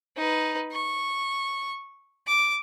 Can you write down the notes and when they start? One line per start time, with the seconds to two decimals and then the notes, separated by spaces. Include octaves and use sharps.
0.17 D#4 B4
0.72 C#6
2.27 D6